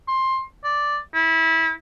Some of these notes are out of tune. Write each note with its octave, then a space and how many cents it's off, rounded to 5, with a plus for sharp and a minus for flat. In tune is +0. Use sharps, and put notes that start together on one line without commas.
C6 +15
D5 +0
E4 -25